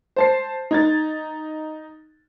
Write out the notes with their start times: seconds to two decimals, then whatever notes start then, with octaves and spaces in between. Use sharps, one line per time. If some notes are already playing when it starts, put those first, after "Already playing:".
0.16 C5 A5 C7
0.71 D#4 G#6 A6